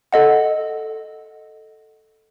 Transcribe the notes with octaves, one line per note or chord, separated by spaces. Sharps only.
A4 D#5 F#5